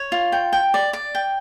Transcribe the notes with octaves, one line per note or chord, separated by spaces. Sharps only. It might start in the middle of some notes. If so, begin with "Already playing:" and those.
Already playing: C#5
F4
G5
G5
D5
D5
G5